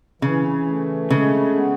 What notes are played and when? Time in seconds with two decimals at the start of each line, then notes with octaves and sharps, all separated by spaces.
0.22 C#3 E3
0.66 A3
1.10 C#3 G#3
1.55 B3